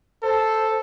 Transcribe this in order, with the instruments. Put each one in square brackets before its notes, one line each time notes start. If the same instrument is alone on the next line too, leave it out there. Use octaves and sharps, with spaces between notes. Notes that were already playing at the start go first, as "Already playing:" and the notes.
[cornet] A4 [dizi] C5